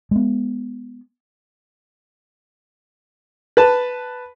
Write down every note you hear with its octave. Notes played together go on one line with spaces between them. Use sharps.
G#3 B3
B4 A5